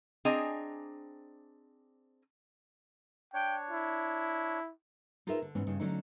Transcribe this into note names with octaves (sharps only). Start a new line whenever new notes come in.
C4 D4 G#4 D#5 G#5 A#5
D4 C#5 G5
E4
D#4 F4 G#4 A#4 B4 E5
D3
G#2 E3 B3 C#4
G2 C#3 D#4
D3 F#3 A3 C#4 D#4